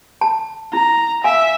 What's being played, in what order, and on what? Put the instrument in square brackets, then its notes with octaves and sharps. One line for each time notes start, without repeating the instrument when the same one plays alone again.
[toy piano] A5
[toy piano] E4 [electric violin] A#5
[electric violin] E5 [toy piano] F5 G#5